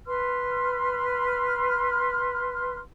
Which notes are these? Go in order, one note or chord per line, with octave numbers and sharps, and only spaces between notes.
B4 C6 F6